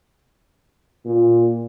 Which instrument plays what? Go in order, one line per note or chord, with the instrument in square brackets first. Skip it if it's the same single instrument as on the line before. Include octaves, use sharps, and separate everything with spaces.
[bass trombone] A#2